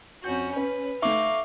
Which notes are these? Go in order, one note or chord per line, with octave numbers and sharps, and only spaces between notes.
F2 C#4 F#4 G6
C#4 B4
A3 D#4 E5 F5 C#6 D6